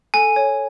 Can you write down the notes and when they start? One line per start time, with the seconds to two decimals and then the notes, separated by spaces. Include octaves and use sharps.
0.14 A4 G#5
0.36 C#5